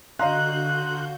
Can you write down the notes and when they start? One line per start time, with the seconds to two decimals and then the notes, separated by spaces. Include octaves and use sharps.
0.19 D3 F#4 D#5 F5 A#5 C6 F#6 G6